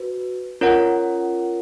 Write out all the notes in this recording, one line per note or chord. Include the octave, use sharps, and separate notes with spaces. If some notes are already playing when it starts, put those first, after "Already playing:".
Already playing: F#4 B4
C#4 F4 A#4 C#5 F#5